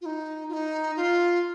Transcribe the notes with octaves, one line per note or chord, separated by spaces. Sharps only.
F4
D#4
F4
D#4
F4